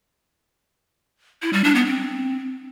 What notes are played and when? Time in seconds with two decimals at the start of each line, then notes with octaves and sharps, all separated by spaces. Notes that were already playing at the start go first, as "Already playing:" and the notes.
1.42 E4
1.53 G3
1.64 D4
1.75 B3
1.86 C4